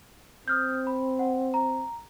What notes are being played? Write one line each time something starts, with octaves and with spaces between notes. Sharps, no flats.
C4 D#6 F6 G6
B5
F#5
A#5